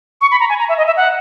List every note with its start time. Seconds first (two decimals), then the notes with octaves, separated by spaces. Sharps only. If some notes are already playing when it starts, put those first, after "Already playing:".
0.21 C#6
0.31 B5
0.40 A#5
0.49 G#5
0.59 A#5
0.69 E5
0.78 D#5
0.87 E5
0.97 F#5